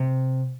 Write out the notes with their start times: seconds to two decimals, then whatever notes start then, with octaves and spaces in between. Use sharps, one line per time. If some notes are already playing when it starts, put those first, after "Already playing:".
Already playing: C3